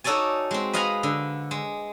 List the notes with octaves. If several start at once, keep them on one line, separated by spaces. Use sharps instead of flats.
D#4 F#4 A4 C#5 D5 G#5
G#3 C4
B4 D#5 F5 F#5 G#5 A#5
D3
G#3